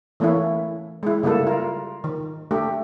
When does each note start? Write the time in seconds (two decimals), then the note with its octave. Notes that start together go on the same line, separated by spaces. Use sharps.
0.20 E3 A3 A#3 C#4 E4
1.03 G#3 E4
1.23 C#3 G3 A#3 E4 A4
1.47 F4 A#4
2.04 D#3
2.51 A3 D4 G4